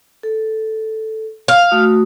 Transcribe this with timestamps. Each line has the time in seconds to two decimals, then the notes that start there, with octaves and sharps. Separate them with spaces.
0.23 A4
1.48 F5
1.71 A3 F#4 D#6